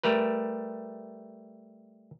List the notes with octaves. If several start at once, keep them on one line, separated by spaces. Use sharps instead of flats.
G3 A3 A#4 B4